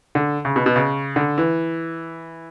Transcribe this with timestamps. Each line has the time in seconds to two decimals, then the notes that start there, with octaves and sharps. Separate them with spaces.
0.15 D3
0.45 C#3
0.56 B2
0.66 B2
0.76 C#3
1.16 D3
1.38 E3